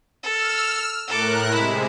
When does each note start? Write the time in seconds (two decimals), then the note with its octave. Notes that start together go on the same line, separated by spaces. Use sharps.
0.23 A4 E6 F6
1.08 A2 A4 A#4 D6 F#6
1.51 C3 G#3 E4 E5